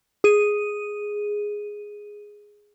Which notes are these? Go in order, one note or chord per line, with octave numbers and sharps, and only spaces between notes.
G#4 D#7